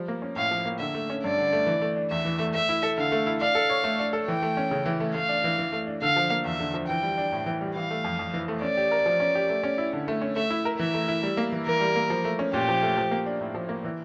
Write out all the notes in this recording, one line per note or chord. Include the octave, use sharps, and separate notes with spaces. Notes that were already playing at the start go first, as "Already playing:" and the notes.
Already playing: F3 G3
A#3
C#4
A2 F5
F3
A#3
D3 E5
A3
C#4
G2 D5
D3
A3
E3
A3
D4
E2 E5
E3
A3
A3 E5
E4
A4
D3 F5
A3
E4
D4 F5
A4
C#5
A3
D4
A4
E3 G5
A3
C#4
C#3
E3
A3
A3 F5
D4
E3
E3
A3
D4
D3 F5
F3
A#3
E2 E5
D3
F3
E3 G5
G3
D4
A2
E3
G3
E3 F5
A3
F2
F2
E3
A3
C#4 D5
G4
A#4
F3
C#4
G4
A3
C#4
E4
D3
A3
C#4
A3 E5
E4
A#4
E3 E5
A3
E4
G3
A#3
E3
E3 A#4
G3
A#3
F3
A3
C#4
A#2 G4
F3
A3
F3
A#3
D4
A2
F3
A#3
E3